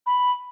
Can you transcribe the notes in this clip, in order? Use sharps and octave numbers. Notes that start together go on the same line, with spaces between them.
B5